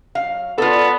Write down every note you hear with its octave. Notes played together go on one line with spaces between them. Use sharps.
F#3 F5
B3 F4 A4 C#5 D5